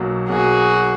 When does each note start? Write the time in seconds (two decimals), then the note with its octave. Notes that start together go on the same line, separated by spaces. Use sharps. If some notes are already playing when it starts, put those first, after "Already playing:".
Already playing: B1 B2 F#3 A#3
0.29 B1 B2 F#3 A#3 F#4 G#4